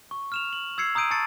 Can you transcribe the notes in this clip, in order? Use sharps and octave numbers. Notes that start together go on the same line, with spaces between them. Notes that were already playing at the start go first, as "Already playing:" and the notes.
C#6
F6 E7 F7
F#7
E6 G#6 C7 C#7
A#5 D#6 E6 G6 D7 D#7
A5 C#6 A6 C#7